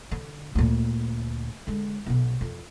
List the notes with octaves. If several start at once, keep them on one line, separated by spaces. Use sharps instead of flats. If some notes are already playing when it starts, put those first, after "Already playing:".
D3
D2 A#2
D3 G#3
B1 B2
F2